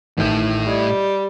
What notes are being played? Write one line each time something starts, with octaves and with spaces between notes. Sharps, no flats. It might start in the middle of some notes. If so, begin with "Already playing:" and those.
A1 A2 D#3 E4 G6
G3 D#5 D#6 G#6